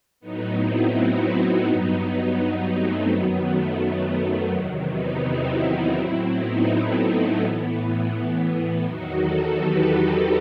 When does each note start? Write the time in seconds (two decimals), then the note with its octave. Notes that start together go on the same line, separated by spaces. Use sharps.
0.20 A2 F#3 B3 D#4
0.57 C4 E4
0.92 D#4 F#4
1.28 B3 D#4
1.65 G2 F#3
2.37 B3
2.72 A3 C4
3.08 F#2 D#3 F#3 B3
3.45 A3
3.80 A3
4.16 B3
4.52 E2 C3 D#3 F#3
4.88 B3 D#4
5.24 C4 E4
5.61 C4 E4
5.96 A2 F#3 C4 E4
6.32 B3 D#4
6.68 A3 C4
7.04 A3 C4
7.40 A2 E3 B3
8.12 B3
8.84 E2 D#3 F#3 D#4 F#4
9.20 F#4 A4
9.56 G4 B4